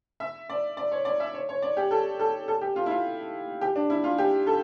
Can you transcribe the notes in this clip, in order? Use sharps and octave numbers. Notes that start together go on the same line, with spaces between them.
E5
D5
D5
C#5
D5
E5
C#5
C#5
D5
G4
A4
A4
A4
G4
F4
E4
F4
G4
D4
E4
F4
G4
A4